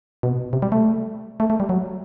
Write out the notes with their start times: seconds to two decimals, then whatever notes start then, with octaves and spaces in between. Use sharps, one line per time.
0.23 B2
0.53 C3
0.62 G3
0.72 A3
1.40 A3
1.50 A3
1.60 G3
1.69 F#3